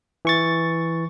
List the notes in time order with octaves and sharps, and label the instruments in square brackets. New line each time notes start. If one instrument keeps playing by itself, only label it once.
[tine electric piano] E3 C#6 A6